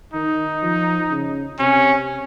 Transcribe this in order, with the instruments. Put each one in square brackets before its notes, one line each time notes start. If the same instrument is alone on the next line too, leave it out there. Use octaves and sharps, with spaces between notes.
[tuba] D#3 [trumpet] D#4
[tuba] F3
C#3
[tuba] C3 [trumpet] C#4